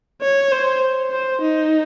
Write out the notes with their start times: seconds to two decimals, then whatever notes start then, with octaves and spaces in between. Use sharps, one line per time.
0.22 C#5
0.52 C5
1.11 C5
1.41 D#4